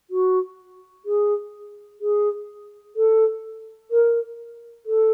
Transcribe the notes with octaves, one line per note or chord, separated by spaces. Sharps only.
F#4
G#4
G#4
A4
A#4
A4